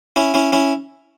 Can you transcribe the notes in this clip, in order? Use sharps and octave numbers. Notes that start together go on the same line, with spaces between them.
C#4 E4
C#4 E4
C#4 E4